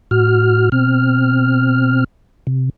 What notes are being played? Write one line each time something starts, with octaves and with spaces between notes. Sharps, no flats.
A2 F#4 F6
B2 C4 F6
C3